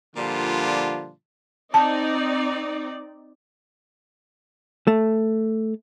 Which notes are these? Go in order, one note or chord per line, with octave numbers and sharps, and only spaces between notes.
A#2 D3 F3 G3 D4 F4
C4 D#4 D5 A5
A3